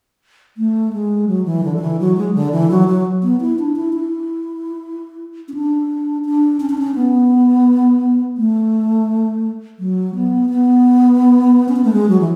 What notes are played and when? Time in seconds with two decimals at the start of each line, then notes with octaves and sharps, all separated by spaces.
0.57 A3
0.93 G#3
1.28 F#3
1.46 E3
1.64 D3
1.76 F#3
1.81 E3
2.00 F#3
2.17 G#3
2.35 D3
2.52 E3
2.70 F#3
2.88 F#3
3.23 B3
3.41 E4
3.59 D4
3.76 E4
3.94 E4
5.48 C#4
5.54 D4
6.25 D4
6.60 C#4
6.70 D4
6.78 C#4
6.95 B3
8.37 A3
9.79 F#3
10.15 B3
10.50 B3
11.68 C#4
11.76 B3
11.85 A3
11.93 G#3
12.09 F#3
12.21 E3